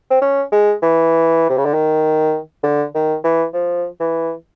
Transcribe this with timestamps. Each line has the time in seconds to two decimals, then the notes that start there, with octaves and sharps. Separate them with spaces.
0.11 C4
0.21 C#4
0.52 G#3
0.82 E3
1.49 C3
1.57 C#3
1.65 D3
1.74 D#3
2.63 D3
2.95 D#3
3.24 E3
3.54 F3
4.00 E3